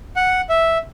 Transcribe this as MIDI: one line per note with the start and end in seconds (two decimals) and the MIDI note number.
0.16 0.41 78
0.49 0.78 76